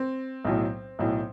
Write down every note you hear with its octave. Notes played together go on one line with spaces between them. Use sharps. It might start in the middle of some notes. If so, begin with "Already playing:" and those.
Already playing: C4
B1 A2 F#3
B1 A2 F#3